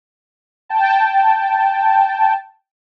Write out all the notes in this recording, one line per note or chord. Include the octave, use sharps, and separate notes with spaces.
G5 A5